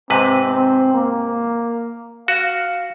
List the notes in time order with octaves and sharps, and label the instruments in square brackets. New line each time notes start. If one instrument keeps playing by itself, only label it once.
[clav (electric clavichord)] G#2 C3 B4 [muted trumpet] C4
[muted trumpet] C4
A#3
[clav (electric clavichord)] F#4 [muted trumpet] F5